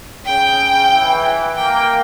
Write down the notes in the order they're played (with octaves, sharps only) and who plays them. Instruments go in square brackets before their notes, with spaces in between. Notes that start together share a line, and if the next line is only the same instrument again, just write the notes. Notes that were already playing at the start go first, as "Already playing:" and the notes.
[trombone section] C#3 [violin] G5
[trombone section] E3
[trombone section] A#3 [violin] G5